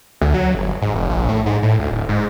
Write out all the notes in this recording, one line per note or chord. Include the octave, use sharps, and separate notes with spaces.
D2
F#3
G1
G#2
F1
A#1
A2
G#2
A2
D2
D1
G#2